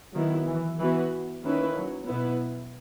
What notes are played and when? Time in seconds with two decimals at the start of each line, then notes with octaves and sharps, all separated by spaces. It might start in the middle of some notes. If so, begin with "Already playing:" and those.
0.14 D#3 F#3 B3 E4
0.46 E3
0.79 E3 B3 F#4 B4
1.44 D#3 A#3 C#4 E4 B4
1.75 F#3
2.08 B2 B3 E4 B4